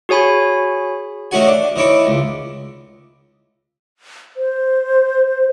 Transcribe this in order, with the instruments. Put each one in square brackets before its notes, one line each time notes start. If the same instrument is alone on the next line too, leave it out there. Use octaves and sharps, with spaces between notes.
[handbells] F#4 G#4 C#5 G#5 B5
[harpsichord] D#3 A3 C#4 F#4 F#5 G#5
D4
D#3 E3 C#5 D6
C#2
[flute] C5